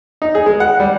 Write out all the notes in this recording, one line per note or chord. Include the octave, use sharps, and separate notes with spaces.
D#4
G#4
G#3
F#5
G3